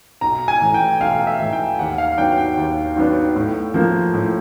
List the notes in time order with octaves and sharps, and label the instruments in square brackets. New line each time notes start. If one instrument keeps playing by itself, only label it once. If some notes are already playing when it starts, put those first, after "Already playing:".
[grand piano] B1 [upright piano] A#5
[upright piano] G#5
[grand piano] A2 E3
[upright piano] G5
[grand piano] B1 [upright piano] F5
[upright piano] E5
[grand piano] A2 E3
[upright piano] G5
[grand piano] D#2 [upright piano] F#5
[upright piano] F5
[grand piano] D#3 F#3 B3 D4 [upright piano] G5
[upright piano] G5
[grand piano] D#2
D#3 F#3 B3 D4
A2
F3 A#3
A2